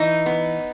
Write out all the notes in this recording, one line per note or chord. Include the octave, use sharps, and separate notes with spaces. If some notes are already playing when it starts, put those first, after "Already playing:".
Already playing: E3 D#4
B3